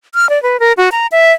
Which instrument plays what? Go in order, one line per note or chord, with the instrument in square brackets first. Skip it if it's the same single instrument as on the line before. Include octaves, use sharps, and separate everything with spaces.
[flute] F6
D5
B4
A#4
F#4
A#5
E5